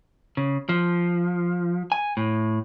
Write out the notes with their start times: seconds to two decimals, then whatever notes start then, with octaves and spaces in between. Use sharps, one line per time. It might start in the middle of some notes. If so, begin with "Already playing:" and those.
0.37 C#3
0.69 F3
1.92 G#5
2.17 A2